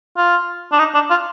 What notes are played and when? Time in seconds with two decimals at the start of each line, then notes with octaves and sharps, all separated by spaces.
0.17 F4
0.72 D4
0.79 D#4
0.94 D4
1.10 F4